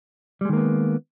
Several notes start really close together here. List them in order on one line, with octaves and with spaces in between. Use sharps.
G3 G#3 D#3 A#3 B3